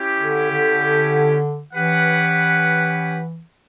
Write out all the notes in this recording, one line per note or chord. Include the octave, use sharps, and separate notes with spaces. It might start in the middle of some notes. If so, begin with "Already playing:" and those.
Already playing: C#4 E4 G4
D3
D3
E3 C#4 G4 B4 F#5